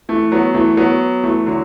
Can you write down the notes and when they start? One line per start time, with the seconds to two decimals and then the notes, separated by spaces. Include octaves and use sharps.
0.09 E3 A3
0.32 F#3 B3
0.54 E3 A3
0.77 F#3 B3
1.24 E3 A3
1.46 D3 F#3